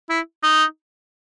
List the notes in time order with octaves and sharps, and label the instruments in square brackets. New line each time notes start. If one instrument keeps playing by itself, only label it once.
[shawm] E4
D#4